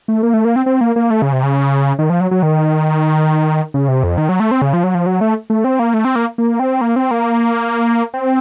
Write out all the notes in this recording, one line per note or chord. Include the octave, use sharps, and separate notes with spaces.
A3
A#3
A3
A#3
C4
C4
A#3
A#3
A3
C#3
C3
C#3
D#3
F3
F#3
F#3
D#3
C#3
C3
F2
D#3
F#3
A3
C4
C#3
F3
F#3
F3
F#3
A3
A3
C4
A#3
A3
C4
A#3
A#3
C4
A#3
C4
A#3
C4